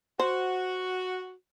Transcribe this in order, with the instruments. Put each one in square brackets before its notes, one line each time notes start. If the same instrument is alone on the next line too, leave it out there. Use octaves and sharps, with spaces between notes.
[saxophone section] F#4 [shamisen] C5